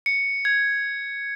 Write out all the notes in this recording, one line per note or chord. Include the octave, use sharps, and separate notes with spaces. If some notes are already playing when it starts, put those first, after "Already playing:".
C#7
G#6